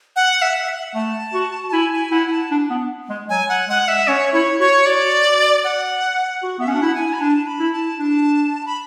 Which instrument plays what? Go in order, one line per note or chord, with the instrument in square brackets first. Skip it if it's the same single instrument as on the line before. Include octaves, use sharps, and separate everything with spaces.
[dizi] F#5
E5
E5
F#5
[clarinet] A3 [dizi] A5
[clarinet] F#4
[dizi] A5
[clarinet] E4 [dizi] G#5
[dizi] G#5
[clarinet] E4 [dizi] F#5
[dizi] A5
[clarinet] D4
B3
G#3
[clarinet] F#3 [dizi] G#5
[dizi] F#5
[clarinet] G#3 [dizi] F#5
[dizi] E5
[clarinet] C#4 [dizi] C#5
[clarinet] E4 [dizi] C#5
[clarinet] F#4 [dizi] C#5
[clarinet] F#4 [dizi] D5
[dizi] F#5
[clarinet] F#4
[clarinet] B3 [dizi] E5
[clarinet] C#4 [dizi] F#5
[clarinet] D4
E4
[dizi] G#5
B5
[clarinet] D4 [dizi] A5
[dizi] B5
[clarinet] E4
[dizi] A5
[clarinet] D4 [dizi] A5
[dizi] B5